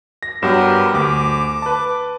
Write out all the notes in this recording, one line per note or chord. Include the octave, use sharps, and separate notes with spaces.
A#6
G2 F#3 B3 G4 A#4 E7
D2 D6
B4 A5